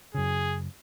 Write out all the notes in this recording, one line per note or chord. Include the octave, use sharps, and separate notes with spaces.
F#2 C#3 G#4